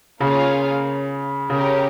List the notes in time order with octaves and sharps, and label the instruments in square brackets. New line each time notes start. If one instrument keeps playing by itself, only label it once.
[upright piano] C#3 [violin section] A#3 F4 G#4 C#5 F5
[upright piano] C#3 [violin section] C#4 G4 A#4